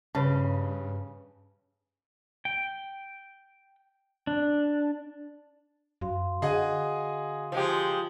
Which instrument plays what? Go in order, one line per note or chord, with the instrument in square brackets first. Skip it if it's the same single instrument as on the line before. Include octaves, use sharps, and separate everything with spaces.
[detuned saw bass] G2 [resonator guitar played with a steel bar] C#3 [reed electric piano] B4 C#5 A5
[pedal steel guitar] G5
D4
[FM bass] F#2 [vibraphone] F#4 F5 C6
[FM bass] D3 [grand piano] G#4 D#5 F#5
[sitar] F3 G#3 G4